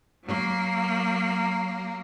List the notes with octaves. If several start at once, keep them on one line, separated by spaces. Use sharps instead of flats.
F#3 A#3